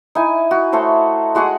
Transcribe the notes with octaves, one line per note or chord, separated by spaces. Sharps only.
D#4 E4 G#5
F#4
A3 A4 C5 C#5
G#3 F#4 G#4 F#5